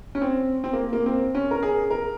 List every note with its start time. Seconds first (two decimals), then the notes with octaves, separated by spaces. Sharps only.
0.15 C#4
0.21 C4
0.64 C4
0.73 A#3
0.93 A#3
1.06 C4
1.35 C#4
1.51 A#4
1.63 G#4
1.90 A#4